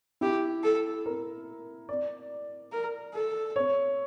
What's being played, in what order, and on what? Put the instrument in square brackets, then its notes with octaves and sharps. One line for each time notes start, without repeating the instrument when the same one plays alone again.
[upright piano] E4 [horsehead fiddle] G4
[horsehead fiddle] A4
[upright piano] A#4
D5
[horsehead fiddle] A#4
A4
[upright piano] C#5